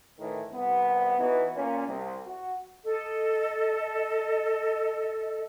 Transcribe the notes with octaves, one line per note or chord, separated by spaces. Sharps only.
A2 D#3 E3
C2 B3
E3 B3 D#4 F#4 B4
A#2 C#4
C2 C3
F#4
A4 D#5